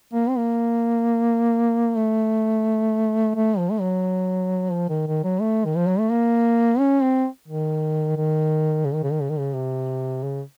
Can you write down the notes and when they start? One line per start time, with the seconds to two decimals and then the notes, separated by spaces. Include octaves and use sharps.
0.13 A#3
0.29 C4
0.37 A#3
1.97 A3
3.35 A3
3.58 F3
3.71 A3
3.80 F#3
4.72 F3
4.89 D#3
5.07 D#3
5.24 F#3
5.41 A3
5.65 D#3
5.76 F3
5.87 F#3
5.99 A3
6.10 A#3
6.79 C#4
7.02 C4
7.48 D#3
8.17 D#3
8.85 C#3
8.94 D#3
9.03 C#3
9.11 D#3
9.21 C#3
9.30 D#3
9.39 C#3
9.54 C3
10.23 C#3